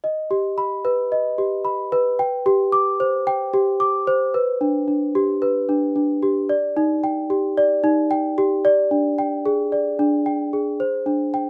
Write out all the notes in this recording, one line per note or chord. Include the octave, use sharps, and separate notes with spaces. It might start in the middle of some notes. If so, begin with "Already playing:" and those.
D#5
G4
B5
B4
D#5
G4
B5
B4
G5
G4
D6
C5
G5
G4
D6
C5
B4
D4
D4
G4
B4
D4
D4
G4
D5
D#4
G5
G4
D5
D#4
G5
G4
D5
D4
G5
G#4
D5
D4
G5
G#4
C5
D4
G5